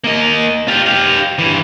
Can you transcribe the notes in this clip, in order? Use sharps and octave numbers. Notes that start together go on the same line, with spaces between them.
A#3 D#5
F4 G4
G4 F5
G2 E3